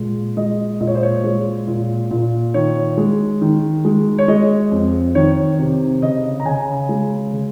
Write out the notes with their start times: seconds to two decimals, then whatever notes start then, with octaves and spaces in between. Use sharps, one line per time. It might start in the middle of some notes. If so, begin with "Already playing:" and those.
Already playing: A#2 G#3
0.37 G#3 D#5
0.80 A#2 D#5
0.87 C#5
0.95 C5
1.03 C#5
1.24 G#3
1.68 A#2
2.11 A#2
2.54 D#3 C#5
2.98 G#3
3.41 D#3
3.85 G#3
4.19 C#5
4.28 G#3 D#5
4.72 F2
5.15 D#3 C#5
5.59 C3
6.02 C#3 D#5
6.40 A#5
6.45 C#3 G#5
6.89 G#3
7.33 C#3